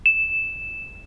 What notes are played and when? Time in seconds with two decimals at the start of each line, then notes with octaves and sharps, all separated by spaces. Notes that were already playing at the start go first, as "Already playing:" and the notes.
0.06 E7